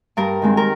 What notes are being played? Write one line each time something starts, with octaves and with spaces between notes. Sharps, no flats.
G2 A#4
D#3 G#3 C4
A#4